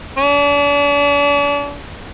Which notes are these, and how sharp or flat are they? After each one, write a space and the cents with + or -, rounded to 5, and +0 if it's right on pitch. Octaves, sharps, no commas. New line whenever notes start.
D4 -40